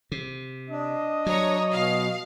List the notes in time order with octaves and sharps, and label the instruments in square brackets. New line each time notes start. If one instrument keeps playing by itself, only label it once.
[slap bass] C3
[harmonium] D4 [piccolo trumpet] D#5
[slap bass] F#3 [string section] C#5 A#5
[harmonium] B2 [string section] F5